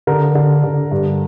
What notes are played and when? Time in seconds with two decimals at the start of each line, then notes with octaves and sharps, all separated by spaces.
0.07 D3 A#4
0.35 D3
0.63 D3
0.91 G2